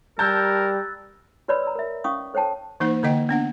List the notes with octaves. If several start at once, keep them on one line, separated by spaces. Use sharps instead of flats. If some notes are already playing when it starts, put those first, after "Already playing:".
G3 A#4 A5 A#5 E6 F#6 G6 A6
F#4 B4 C#5 D5 B5 E6
A#5 E6
A#4 E5
C#4 F5 C#6 D#6
A4 C5 C#5 G5 A5
E3 A#3 D#4 C5
D3 A#3 D#5 G5
B3 D4 F#5